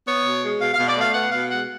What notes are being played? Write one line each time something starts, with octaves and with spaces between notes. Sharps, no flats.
B3 C#5
B2
G#3
B2 F5
F5
B2
D5
A3
F5
B3 F#5
B2 F5
G#3 F#5